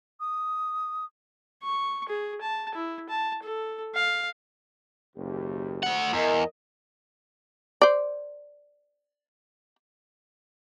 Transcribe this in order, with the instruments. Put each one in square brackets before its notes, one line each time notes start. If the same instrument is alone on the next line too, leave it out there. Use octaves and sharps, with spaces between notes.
[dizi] D#6
[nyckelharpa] C#6
G#4
A5
E4
A5
A4
F5
[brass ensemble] F#1 D#2 G4
[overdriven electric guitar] A3 F#5
[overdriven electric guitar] E2 [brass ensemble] A#4 D#5
[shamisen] C5 D5